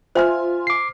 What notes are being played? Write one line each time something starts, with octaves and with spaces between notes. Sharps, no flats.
F4 C5 E5 G#5 F6
D6 C7